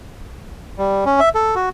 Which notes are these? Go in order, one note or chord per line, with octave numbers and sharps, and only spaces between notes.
G3
C#4
E5
A4
F#4